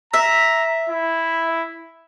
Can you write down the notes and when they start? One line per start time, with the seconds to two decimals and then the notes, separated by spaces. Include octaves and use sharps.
0.14 E5 A#5
0.90 E4